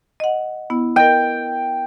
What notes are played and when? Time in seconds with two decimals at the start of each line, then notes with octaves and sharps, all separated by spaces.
0.20 D#5 F#5
0.70 B3 E4
0.96 A#4 D#5 G5